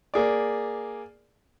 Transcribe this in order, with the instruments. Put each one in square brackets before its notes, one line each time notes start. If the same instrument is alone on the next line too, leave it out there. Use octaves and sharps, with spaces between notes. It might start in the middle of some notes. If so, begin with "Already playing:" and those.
[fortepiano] A#3 G#4 D5